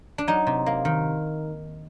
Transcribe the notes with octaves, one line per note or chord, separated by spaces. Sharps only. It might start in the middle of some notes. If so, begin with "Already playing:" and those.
D4
F#3 D#4
C3
A#3
D#3